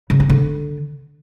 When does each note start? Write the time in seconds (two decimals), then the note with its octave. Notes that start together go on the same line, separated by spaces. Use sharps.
0.10 C#3
0.20 C#4
0.30 D3